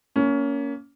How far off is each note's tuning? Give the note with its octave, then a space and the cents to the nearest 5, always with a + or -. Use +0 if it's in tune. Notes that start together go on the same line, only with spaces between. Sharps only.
A#3 +0 C#4 +20